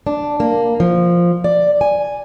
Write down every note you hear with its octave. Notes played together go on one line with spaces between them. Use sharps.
D4
A#3
F3
D5
G#5